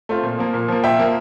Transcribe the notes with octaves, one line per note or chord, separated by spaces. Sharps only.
A3 C4 F4
A#2
F3 A#3
A#2
F3 A#3
A#2 E5 G5
F3 A#3